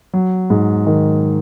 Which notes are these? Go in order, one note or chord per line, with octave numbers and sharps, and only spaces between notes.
F#3
G#2
D#3